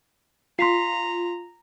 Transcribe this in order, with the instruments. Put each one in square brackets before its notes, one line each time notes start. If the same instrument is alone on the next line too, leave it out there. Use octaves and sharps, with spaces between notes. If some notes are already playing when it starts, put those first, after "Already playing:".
[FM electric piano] F4 [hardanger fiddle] A#5 [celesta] C6 B6 C7